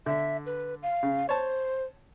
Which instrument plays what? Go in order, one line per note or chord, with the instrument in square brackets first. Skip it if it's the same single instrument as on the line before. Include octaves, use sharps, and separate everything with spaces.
[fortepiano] D3 [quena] E5
[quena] B4
F5
[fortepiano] C#3
[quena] C5 [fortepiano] C#5 A5